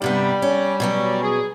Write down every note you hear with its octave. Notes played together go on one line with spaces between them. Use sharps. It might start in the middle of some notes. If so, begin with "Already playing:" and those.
G2 C3 G3 B3
C#4
B2 F#3 C#4
G#4